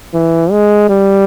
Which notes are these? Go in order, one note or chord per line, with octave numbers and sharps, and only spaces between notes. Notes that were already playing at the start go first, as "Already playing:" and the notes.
E3
G#3
G3